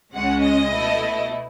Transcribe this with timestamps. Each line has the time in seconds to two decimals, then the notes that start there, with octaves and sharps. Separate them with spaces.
0.13 C#2 C#3 G#3 C#4 F#5
0.43 D#5
0.72 B2 A3 E4